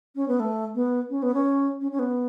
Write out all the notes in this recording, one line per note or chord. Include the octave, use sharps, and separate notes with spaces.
C#4
B3
A3
B3
C#4
B3
C#4
C#4
C#4
B3